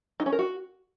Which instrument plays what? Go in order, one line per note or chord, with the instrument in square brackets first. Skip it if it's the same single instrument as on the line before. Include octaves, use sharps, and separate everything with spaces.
[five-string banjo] D#4
C#4
A#4
F#4